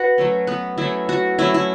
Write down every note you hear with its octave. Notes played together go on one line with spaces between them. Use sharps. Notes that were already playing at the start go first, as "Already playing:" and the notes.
Already playing: F#4 B4 F#5
F#3 A3 C#4
B3 B4
F#3 A3 C#4 E4
F#4
F#3 A3 C#4 E4
E4